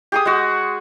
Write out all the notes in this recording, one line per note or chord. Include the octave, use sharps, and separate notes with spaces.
G4 G#4 D#6
G#3 F#4